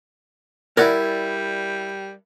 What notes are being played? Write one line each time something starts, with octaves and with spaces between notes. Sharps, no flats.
G3 E4 A#4 D5 F#5 G#5